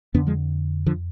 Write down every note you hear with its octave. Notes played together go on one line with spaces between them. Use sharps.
F2 D3 B3 D4
F3 G#3
D3 F3